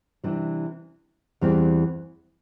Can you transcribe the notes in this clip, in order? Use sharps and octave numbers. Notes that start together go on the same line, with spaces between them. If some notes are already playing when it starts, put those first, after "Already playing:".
C3 E3 G3 D4
E2 E3 G3 C4